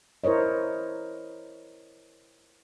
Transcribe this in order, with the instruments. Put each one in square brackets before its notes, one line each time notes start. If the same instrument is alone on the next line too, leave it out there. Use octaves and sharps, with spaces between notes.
[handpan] E4 A#4 C5 C#5 D#5